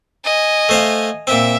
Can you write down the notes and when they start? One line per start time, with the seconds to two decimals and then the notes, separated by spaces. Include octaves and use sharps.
0.24 D#5 G#5
0.69 A3 C5 F5
1.27 A#2 C4 E5